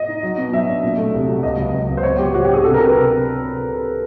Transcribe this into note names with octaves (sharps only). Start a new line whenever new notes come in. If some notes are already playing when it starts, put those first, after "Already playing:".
Already playing: D#5
D#4
F#3
B2
F#3 E5
D4
A#2
A3
C2
F#3
C#2 D#5
C#2
C#2
C#2
C5
B3 C#5
F#3 G4
F#3 F#4
D4 G4
G#4
C3 A4
A#4
C3
B4
C3
C3